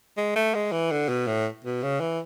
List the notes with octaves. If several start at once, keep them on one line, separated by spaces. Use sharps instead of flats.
G#3
A3
G#3
E3
D3
B2
A2
B2
C#3
E3